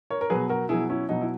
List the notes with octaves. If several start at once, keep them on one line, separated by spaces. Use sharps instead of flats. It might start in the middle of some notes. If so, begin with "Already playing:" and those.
A#4 C#5
A#4
B2 F#3 G#4 B4
F#4 A#4
B2 F#3 E4 G#4
C#4 E4
B2 F#3 D#4
E4